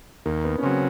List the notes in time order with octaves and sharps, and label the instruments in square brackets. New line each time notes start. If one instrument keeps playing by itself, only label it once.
[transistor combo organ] D#2 [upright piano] A#3
[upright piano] B3
C#4
[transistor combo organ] C#3 F#3 [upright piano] C4